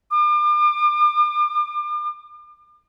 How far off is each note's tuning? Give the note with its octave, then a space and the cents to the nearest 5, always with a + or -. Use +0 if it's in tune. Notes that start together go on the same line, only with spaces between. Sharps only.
D6 +40